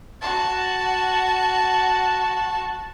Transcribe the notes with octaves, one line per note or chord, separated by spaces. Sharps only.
F#4 A5